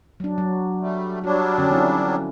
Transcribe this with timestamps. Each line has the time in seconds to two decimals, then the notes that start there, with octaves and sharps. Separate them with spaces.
0.20 F#3 D4
0.38 F#3
0.81 G3 A3
1.24 F#3 G3 D4 F#4
1.58 D3 C#4
1.71 F3 C4 E4